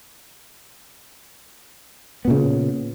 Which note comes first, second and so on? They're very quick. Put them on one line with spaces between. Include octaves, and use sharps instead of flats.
B3 A#2 C#3